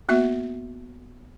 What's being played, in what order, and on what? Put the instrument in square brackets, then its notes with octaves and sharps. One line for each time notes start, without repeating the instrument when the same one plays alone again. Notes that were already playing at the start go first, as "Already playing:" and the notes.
[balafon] A#3 B3 F#4 E5